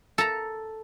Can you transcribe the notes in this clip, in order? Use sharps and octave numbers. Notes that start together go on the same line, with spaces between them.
A4 A#5